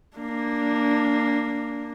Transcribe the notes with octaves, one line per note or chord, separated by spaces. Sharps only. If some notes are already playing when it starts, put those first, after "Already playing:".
A#3 D4